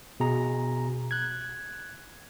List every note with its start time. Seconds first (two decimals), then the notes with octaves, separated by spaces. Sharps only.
0.20 B2 G#4 A#5
1.11 F#6 G#6